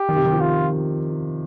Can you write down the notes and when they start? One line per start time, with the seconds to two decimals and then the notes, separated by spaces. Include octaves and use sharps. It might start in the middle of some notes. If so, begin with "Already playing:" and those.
Already playing: G4
0.09 D#3
0.16 C3
0.25 D#3
0.33 F3
0.41 F4